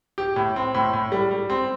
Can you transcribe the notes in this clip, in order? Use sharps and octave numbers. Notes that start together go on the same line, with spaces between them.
G4
A2
C4
A2
A2
G3
G3
C4